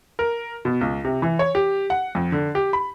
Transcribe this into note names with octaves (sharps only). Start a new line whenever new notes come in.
A#4
B2
C#2
C3
E3
C#5
G4
F#5
F2
D3
G4
B5